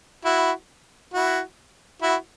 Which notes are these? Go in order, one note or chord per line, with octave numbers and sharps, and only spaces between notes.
E4 F#4
E4 F#4
E4 F#4